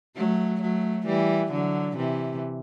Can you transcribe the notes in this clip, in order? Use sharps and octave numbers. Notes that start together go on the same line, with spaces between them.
F#3 A3
F#3 A3
E3 G3
D3 F#3
C3 E3